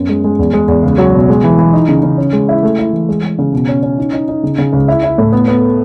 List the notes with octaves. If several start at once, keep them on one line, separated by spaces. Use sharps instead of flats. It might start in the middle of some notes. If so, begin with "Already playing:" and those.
Already playing: F#2 B3
G#3
G#3
E2
G#3
E2
C#2
F#3
B2
G#3
E3
E3
D#4
C#3
C#3
C#4
G#3
E4
A3
E4
E3
G#3
G#3
C#3
B2
C#4
C#4
D#4
D#4
D#4
C#3
C#3
C#2
E4
E4
A2
B3
B3